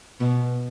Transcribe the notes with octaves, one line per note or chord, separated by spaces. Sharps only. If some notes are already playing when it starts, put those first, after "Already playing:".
B2